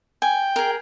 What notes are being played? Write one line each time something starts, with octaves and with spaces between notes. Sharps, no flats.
G5 G#5
G#4 A#4